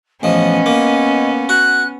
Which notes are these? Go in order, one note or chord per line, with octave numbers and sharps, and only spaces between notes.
A1 F3 B3 C#4 D#5
A#3
F#4 F#6